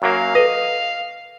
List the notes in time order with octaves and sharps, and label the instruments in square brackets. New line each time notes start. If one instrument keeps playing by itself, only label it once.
[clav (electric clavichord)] F#2 F#3 A#3 [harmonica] F5
[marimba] A4 B4 [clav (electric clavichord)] D#5